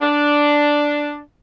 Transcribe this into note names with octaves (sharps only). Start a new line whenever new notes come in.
D4